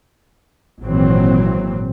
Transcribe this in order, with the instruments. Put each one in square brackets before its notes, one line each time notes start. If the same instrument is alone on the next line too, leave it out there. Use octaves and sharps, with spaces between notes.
[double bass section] G#1 A#2 E3 F#3 C4